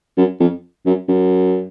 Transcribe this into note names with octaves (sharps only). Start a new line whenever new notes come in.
F#2
F2
F#2
F#2